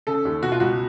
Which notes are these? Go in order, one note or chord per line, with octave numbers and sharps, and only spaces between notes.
C#3 A4
D#2
B2 F#4
F4
C#2 F#4